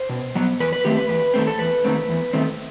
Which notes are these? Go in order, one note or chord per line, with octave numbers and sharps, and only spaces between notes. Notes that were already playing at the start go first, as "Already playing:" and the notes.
Already playing: C5
B2
F#3 B3
E2 B4
B4
D#3 A3 C4 G4
B4
E2 B4
D#3 A3 C4
A4
E2 B4
D#3 A3 C4
E2
D#3 A3 C4